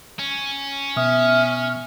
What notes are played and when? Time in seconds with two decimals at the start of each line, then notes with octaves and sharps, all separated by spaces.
0.19 C#4
0.96 B2 B3 E5 D#6 F6